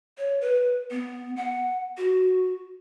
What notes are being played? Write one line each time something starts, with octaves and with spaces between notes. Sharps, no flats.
C#5
B4
B3
F#5
F#4